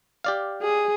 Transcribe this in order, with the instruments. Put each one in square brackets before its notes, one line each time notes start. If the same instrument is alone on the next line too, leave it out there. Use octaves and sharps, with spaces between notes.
[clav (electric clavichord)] G4 D5 F5
[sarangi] G#4